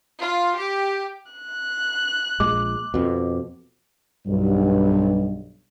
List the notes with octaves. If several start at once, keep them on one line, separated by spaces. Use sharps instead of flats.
F4
G4
F#6
A#1 A#2 G#3 D6
F2 B2
B1 G2